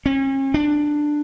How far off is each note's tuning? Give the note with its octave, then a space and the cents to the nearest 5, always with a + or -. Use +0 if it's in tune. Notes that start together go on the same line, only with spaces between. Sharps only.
C#4 -40
D4 +10